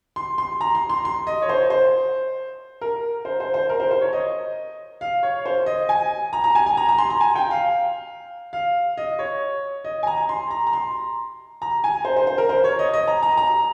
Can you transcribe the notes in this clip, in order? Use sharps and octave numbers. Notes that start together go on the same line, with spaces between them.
C6
C6
A#5
C6
C6
C6
D#5
C#5
C5
C5
A#4
C5
C5
C5
A#4
C5
C5
C#5
D#5
F5
C#5
C5
D#5
G#5
A#5
A#5
G#5
G#5
A#5
A#5
C6
A#5
G#5
G5
F5
F5
D#5
C#5
D#5
G#5
A#5
C6
A#5
A#5
C6
A#5
G#5
C5
C5
C5
A#4
C5
C#5
D#5
D#5
A#5
A#5
A#5